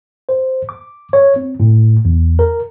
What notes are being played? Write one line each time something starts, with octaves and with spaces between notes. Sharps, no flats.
C5
D6
C#5
C4
A2
E2
A#4